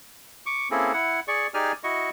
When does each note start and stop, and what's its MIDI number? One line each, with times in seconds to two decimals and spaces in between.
0.46 0.69 85
0.46 0.69 86
0.71 0.93 58
0.71 0.93 60
0.71 0.93 61
0.71 0.93 64
0.71 0.93 68
0.71 0.93 69
0.93 1.20 64
0.93 1.20 78
1.28 1.47 68
1.28 1.47 74
1.28 1.47 85
1.54 1.72 63
1.54 1.72 67
1.54 1.72 68
1.54 1.72 74
1.54 1.72 80
1.54 1.72 89
1.84 2.10 64
1.84 2.10 66
1.84 2.10 75
1.84 2.10 85